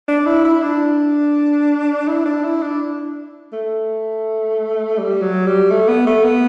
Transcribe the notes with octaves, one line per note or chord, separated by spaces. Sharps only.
D4
E4
E4
D4
E4
D4
E4
D4
A3
G3
F#3
G3
A3
B3
A3
B3